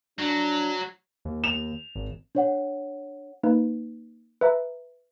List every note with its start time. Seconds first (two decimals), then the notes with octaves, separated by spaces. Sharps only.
0.19 F#3 D4
1.25 D#2
1.44 E7 F7
1.95 G#1
2.35 D4 C#5 F#5
3.43 A#3 D#4 B4
4.41 B4 E5 A#5